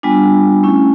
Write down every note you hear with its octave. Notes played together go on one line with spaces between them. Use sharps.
G3 B3 D4 F4 G#5
A3 C#4 E4